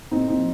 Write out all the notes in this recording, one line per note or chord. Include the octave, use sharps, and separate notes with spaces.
A2 C4 D#4
C4 D#4
F3